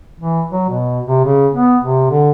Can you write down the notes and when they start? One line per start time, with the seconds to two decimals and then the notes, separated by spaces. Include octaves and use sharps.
0.20 E3
0.51 F#3
0.69 B2
1.05 C3
1.25 C#3
1.54 B3
1.82 C3
2.10 D3